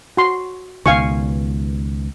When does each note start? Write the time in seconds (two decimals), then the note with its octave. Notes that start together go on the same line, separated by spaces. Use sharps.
0.17 F#4 C6
0.86 C#2 B2 D#3 F5 G#5 C#6